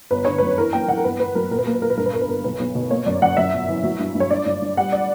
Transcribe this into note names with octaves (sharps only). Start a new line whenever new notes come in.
G1 B4
D3 C#5
F#2 B4
E3 A#4
A#3 G5
E3 F#5
A#4
G1 B4
B3 B4
F#3 A#4
A#2 A#4
B4
A#3 A#4
B4
A#3 A#4
B4
G2 A#4
B4
G1 A#4
B4
G1 A#4
B1 B4
B1
B2
A#3 C#5
F#2 D5
F#2 F#5
F#2 E5
G1
E3
F#3
G2
G2
C#5
G2 D5
G2
G2
G3 F#5
D5